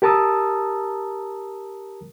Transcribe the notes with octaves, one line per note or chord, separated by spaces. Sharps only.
G4 A#4 A5 A#5 D#6 E6